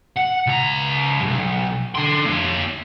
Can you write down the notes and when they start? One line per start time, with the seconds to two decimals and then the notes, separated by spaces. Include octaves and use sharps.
0.16 F#5
0.47 C#2 A#5
1.22 B1 G2
1.96 D3 C6
2.25 A#3 C#5